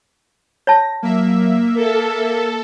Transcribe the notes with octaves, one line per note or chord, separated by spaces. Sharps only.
C#5 A5 A#6
F#3 A#3 E5
A4 A#4